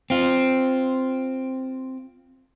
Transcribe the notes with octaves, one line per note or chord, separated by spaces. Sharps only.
C4 F4